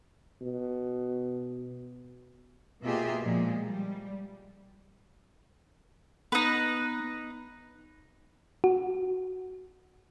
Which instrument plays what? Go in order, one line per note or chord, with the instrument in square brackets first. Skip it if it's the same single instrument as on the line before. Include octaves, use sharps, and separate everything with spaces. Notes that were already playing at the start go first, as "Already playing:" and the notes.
[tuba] B2
[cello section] B2 A#3 F4 G4 G#4 E5
A#2 F3 G#3
G3
[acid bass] B3 [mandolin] D#4 B4
[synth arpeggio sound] F#4